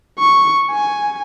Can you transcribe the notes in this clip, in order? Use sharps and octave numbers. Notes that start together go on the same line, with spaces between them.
C#6
G#5